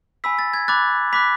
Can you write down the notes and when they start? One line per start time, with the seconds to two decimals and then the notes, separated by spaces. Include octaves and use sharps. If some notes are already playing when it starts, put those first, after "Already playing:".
0.24 G#5 B5 E6 B6
0.39 A6
0.54 G#6
0.68 B5 D6 F#6 A6
1.13 B5 D6 F#6 B6